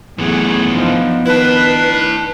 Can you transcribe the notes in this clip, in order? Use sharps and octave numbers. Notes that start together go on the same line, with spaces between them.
F#2 E3 A3 B3 G#4
F3 D4 D#4
D#3 D4 E4 B4 A5